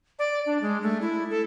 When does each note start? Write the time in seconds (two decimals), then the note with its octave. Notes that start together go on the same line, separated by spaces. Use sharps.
0.19 D5
0.46 D4
0.62 G#3
0.83 A3
1.02 E4
1.30 A4